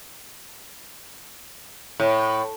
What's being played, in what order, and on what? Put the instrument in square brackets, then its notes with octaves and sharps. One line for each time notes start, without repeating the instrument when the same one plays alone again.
[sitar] A2